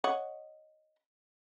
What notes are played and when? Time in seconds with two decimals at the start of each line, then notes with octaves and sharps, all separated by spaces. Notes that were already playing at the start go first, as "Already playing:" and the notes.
0.04 C#5 D#5 F#5